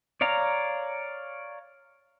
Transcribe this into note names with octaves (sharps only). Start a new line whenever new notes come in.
C#5 D5 F5 A#5